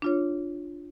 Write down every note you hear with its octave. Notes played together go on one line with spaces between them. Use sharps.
D4 F4 C#5